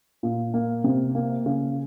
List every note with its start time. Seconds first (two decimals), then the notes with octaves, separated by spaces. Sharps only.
0.23 A#2
0.54 A#3
0.84 C3
1.15 A#3
1.46 C#3